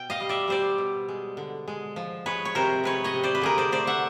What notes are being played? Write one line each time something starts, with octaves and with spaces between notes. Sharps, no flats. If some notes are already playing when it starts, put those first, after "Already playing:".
Already playing: B2 G5
D#5 F5
G3
D5 E5
G3 C5 D5
B2
G#3
D3
G#3
F3
G#3 B4 C#5
C#5
C3 A#4 C5
G#3 B4 C#5
C#5 D#5
C3
C5 D5
B4
D3 G#4 A#4
C5 D5
A3 C5 D5
E5 F#5